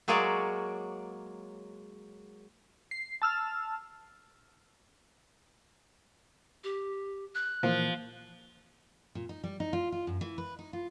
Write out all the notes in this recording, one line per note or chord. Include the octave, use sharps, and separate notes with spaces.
F#3 G#3 A#3 G#4 C#5 D5
C7
A5 E6 F6
G4
F#6
A#2 E3 F3 A#3
A#2
D#4
G3
D#4
F4
F4
F#2
E3
B4
D#4
F4